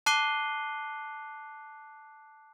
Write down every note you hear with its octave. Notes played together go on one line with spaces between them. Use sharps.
A5 D6 F#6 C7 D#7 G7